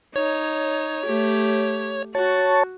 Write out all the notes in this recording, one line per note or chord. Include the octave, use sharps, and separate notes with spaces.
D#4 C#5
A3 G4
F#4 C#5 A5